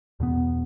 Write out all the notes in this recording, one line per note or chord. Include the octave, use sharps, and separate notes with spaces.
E2 B2 B3